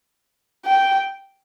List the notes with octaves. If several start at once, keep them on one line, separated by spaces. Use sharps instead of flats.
G5